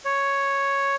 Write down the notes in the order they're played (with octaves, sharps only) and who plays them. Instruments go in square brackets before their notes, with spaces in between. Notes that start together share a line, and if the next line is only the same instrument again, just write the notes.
[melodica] C#5